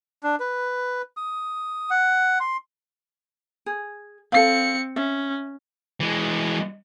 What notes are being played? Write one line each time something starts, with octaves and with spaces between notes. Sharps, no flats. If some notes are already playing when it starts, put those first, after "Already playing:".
D4
B4
D#6
F#5
C6
G#4
C4 A4 F5 C#7
C#4 E5
E3 G#3